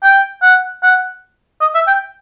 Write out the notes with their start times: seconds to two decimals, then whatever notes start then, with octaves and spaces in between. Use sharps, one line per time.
0.04 G5
0.43 F#5
0.83 F#5
1.61 D#5
1.75 E5
1.87 G5